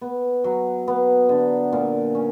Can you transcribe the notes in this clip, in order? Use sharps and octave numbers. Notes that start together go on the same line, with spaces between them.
B3
F#3
B3
D3
A#2
C#4